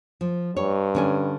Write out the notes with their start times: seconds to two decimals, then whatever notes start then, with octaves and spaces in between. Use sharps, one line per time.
0.21 F3
0.57 G2 C#5
0.95 D3 C#4 G#5